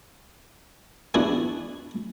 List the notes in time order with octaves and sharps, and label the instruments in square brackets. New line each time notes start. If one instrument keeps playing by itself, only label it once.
[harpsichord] E2 B3 D4 E4 F#4 G#4